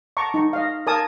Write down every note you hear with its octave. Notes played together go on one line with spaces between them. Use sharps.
A5 A#5 C#6 D6
D#4 C#6
D#5 F5
A#4 F5 G#5 A5 D#6